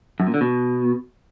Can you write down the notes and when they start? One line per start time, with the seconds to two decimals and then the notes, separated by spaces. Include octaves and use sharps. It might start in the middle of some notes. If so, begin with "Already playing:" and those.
0.20 F#2
0.27 A#2
0.34 D3
0.41 B2